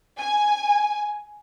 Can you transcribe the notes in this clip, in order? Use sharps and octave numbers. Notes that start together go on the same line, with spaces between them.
G#5